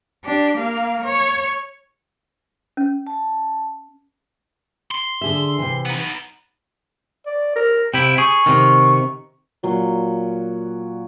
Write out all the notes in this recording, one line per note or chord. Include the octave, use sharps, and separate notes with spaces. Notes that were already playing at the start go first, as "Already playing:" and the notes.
D4 G4
A#3 F5
C#5
C#4
A5
C6
D3 G#4 E5
C3 E3
B3 D#4
D5
A#4
C3 E4 G5
G#4 C#6
C3 D#3
A#2 F#3 C6